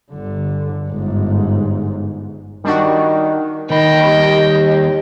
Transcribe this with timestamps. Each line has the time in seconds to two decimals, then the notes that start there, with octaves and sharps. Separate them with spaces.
0.12 G1 D3
0.89 G1 G#2
2.65 D#3 G3 D4 F#4
3.70 D#2 D#3 D#5 G5 B5
4.04 G3